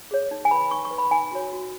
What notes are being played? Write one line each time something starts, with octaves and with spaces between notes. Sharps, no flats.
G#4 C#5
D#4
G#5
B4 B5
D#4 C#6
C#6
B4
B5
D#4 G#5
F#4 C#5
F#4